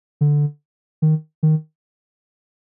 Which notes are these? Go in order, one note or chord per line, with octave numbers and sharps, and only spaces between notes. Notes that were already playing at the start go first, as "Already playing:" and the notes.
D3
D#3
D#3